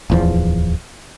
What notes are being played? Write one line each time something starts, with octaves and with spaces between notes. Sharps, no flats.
D1 E2 F3